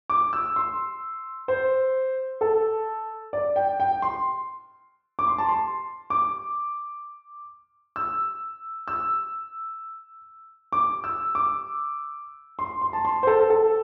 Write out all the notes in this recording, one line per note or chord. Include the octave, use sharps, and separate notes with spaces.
D6
E6
C6
C5
A4
D5
G5
G5
C6
D6
C6
A5
C6
D6
E6
E6
D6
E6
D6
C6
C6
A5
C6
C5
A4
A4